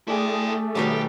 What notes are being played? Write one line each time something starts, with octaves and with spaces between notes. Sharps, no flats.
A3 D4 E4 G#4 G5
B2 D#3 F#3 G3 G4 B4